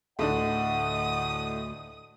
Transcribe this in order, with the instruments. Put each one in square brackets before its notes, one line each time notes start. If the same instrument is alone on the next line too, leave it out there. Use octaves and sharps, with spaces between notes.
[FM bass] D2 [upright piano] A2 D3 D4 [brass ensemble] D#5 F#5 [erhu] D#6